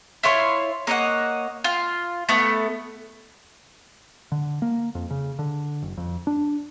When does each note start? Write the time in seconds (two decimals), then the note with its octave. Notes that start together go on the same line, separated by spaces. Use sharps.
0.23 E4 F4 C#5 C6
0.87 A#3 C#5 D#5 F#5
1.64 F4
2.29 A3 B3
4.32 D3
4.62 A#3
4.95 F2
5.10 C#3
5.39 D3
5.82 F#1
5.97 F2
6.27 D4